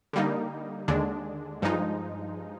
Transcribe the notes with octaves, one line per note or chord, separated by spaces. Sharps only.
D3 G3 A#3 D#4
D#2 D3 G#3 D4
G2 F3 G#3 D#4